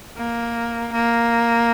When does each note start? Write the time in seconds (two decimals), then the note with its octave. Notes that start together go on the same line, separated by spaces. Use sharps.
0.17 A#3
0.93 A#3